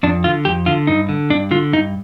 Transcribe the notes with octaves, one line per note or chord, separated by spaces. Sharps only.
F2 D4
D3 F4
F2 G4
D3 F4
G2 D#4
D3
G2 D4
D3 F4
G2 D#4